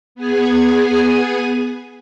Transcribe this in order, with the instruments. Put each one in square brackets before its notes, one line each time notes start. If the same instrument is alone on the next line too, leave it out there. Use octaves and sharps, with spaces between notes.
[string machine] B3 G#4 G#5